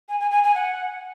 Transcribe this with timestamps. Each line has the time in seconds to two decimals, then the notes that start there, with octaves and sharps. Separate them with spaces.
0.09 G#5
0.20 G#5
0.31 G#5
0.44 G#5
0.55 F#5